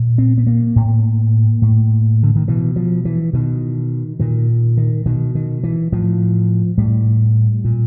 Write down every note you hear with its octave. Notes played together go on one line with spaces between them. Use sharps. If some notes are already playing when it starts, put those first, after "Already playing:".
Already playing: A#2
C4
B3
A#3
A2
A2
D3
D#3
B2 E3
F3
E3
B2 D#3
A#2 D#3
D#3
B2 D#3
D#3
E3
A2 F3
A2 G3
A#2